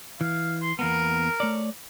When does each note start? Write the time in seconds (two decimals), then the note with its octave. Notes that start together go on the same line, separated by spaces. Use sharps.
0.21 E3 F5
0.62 C6
0.79 E2 A#3 B3 A#4
1.40 A3 C#5 D5